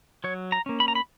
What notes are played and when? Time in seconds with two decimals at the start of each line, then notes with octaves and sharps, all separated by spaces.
0.24 F#3 C#5
0.52 A#5
0.66 A#3 C#4
0.80 B5
0.88 A#5
0.95 B5